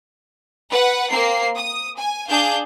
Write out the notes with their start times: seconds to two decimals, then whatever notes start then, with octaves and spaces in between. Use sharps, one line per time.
0.71 B4 F#5
1.11 A#3 C4 C7
1.57 D#6
1.98 G#5
2.29 D4 G#4 F5 G6